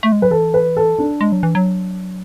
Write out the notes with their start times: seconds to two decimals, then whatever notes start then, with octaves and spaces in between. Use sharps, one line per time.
0.03 A3
0.12 G#3
0.22 F#3 B4
0.31 E3 A4
0.54 B4
0.77 A4
0.99 D4
1.21 G#3
1.32 F#3
1.43 E3
1.55 F#3